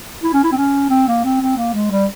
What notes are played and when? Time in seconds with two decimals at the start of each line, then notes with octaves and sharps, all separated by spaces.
0.23 E4
0.33 C#4
0.44 E4
0.52 C4
0.57 C#4
0.90 C4
1.08 A#3
1.24 C4
1.41 C4
1.57 A#3
1.74 G#3
1.91 G3